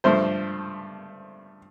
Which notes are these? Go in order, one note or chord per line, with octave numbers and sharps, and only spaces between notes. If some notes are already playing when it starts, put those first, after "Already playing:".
G2 F3 A3 C5